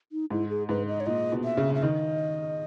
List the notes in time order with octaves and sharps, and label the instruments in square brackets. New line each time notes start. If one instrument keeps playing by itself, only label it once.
[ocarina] D#4
[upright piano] G#2 [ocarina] E4
[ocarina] G#4
[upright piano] G#2 [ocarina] B4
[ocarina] D#5
C#5
[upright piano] A#2 [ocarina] D#5
[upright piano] B2
[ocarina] E5
[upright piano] C#3
[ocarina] E5
[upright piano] D#3 [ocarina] D#5